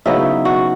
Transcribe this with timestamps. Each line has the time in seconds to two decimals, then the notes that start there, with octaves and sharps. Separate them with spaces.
0.06 C#3 F#3 B3 D#4 E4
0.45 F#4